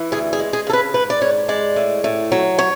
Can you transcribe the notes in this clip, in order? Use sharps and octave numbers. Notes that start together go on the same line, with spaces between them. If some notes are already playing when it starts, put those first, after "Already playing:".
Already playing: E3
D2 G#4
G#4
G#3
G#4
C#3 A4
B4
G#2 B4
D5
G#2 C#5
G#3 D5
A2
A2
F#3
C#5